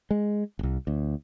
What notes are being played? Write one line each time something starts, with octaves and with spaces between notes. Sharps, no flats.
G#3
E1 C2
D2